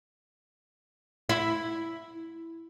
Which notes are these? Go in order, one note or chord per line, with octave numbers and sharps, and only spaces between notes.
E4